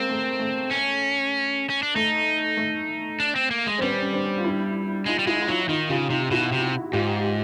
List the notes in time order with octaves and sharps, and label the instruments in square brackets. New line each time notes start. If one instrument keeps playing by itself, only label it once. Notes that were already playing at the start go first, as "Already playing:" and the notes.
Already playing: [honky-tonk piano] G#3 A#3 [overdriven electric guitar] C4
[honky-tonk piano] A3
A3
[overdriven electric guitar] C#4
C#4
D4
[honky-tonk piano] A3 [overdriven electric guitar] D#4
[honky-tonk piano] A3
[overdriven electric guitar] D4
C4
A#3
G#3
[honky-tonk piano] C4
[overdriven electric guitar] G3 [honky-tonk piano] B3 C#4
[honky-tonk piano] C#4
C4 D4
F4
D4 E4
[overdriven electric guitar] G#3 [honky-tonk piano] D#4 F4
[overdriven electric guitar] G3
[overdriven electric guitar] G#3 [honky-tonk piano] E4 F#4
[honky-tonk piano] E4
[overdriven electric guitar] F#3 [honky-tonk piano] D#4 F4
[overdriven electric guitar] D#3 [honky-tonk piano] D#4 F4
[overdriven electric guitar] C#3 [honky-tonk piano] F4 G4
[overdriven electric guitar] C3 [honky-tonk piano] D#4 F4
[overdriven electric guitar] B2 [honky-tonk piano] E4 F#4
[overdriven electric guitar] C3
[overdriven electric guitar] G#2 [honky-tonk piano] F4 G4